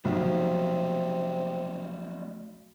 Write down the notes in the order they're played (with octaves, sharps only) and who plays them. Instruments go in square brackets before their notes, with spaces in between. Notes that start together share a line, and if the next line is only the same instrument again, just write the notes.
[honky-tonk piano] B1 [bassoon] C3 [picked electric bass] F3 F#3 A3